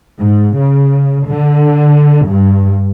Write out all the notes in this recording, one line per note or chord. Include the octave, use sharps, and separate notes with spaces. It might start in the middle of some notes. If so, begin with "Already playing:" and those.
G#2
C#3
D3
G2